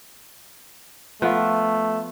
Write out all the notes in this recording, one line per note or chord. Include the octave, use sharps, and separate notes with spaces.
F3 A3 B3